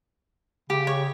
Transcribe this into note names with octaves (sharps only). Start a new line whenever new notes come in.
C#3 G4
C#5